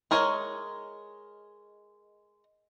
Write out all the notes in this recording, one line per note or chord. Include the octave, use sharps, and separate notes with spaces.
G#3 A#4 C#5 D#5